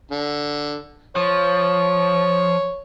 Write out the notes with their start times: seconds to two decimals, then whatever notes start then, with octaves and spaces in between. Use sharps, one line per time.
0.11 D3
1.16 F3 C#5